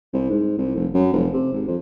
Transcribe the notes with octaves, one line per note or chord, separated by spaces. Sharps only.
C2
G#2
C2
F1
F#2
F1
C3
G#1
F2